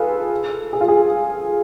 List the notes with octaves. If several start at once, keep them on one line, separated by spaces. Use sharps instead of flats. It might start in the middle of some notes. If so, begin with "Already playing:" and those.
Already playing: F4 G#4 A4 B4
G#4
F4
G#4